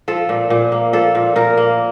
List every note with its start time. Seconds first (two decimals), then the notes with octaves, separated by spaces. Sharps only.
0.08 F3 A4
0.29 A#2
0.50 A#2
0.72 A#3
0.93 F3 A4
1.15 A#2
1.36 A#2 A#4
1.57 A#3